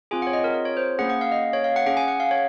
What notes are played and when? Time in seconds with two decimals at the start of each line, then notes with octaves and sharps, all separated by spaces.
0.11 C4 F4 G#4 G#5
0.22 C#5 F#5
0.33 D#5
0.44 A#4
0.54 A#4
0.65 C#5
0.77 C5
0.99 A#3 C#4 G#4 F#5
1.10 F#5
1.21 F5
1.32 D#5
1.53 C#5
1.64 F5
1.76 F#5
1.86 C#4 G#4 F#5
1.97 G#5
2.08 F#5
2.20 F5
2.31 C#5